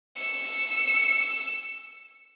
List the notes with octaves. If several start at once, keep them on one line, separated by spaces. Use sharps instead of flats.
E6 C#7